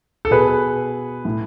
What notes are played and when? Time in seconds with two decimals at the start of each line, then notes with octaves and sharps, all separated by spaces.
0.25 A4
0.31 B2 G#4 B4
1.25 A2